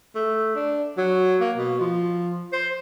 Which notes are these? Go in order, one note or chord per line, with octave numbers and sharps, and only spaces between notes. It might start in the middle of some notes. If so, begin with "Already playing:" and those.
A3
D4
F#3
A#3
B2
F3
C5